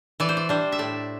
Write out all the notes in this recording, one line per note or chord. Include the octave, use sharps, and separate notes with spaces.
E3 D5
C5
D5
G3 D4 C5
E5
A2 D5